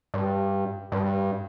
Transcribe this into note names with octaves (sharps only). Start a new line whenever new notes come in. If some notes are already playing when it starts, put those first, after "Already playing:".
G2
G2